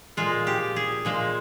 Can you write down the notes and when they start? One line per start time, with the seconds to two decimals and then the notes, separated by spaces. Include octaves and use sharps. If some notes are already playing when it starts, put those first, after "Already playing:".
0.17 A#2 F3 G#3 F4
0.47 G4
0.76 G#4
1.05 A#2 F3 G#3